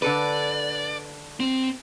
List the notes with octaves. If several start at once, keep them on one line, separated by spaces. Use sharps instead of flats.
D3 A4 B4 D5
C4